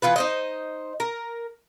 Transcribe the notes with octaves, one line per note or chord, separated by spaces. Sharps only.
E3 B3 F4 B4
D#4 C5 D#5
A#4